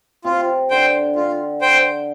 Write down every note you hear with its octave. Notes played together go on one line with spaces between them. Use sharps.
C3 F4
D3 C5 G5
D3 F4
C5 G5